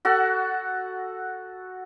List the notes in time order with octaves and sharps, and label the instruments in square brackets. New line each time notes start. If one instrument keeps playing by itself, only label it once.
[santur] F#4 A4 F#5